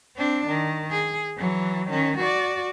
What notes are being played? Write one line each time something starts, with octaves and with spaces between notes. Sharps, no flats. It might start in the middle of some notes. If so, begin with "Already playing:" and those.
C4 D4
D#3
G#4
E3 F#3
D#3 C#4
F#4 D5